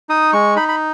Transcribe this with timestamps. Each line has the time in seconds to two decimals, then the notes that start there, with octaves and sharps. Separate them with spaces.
0.09 D#4 D#6
0.33 G#3 C#6
0.56 D#4 B5
0.68 B5